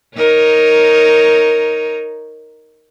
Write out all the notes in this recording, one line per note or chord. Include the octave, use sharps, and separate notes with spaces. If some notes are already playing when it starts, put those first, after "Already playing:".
D#4 A#4 C#5